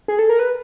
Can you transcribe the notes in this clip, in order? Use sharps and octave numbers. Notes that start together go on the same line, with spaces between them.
G#4
A4
A#4
B4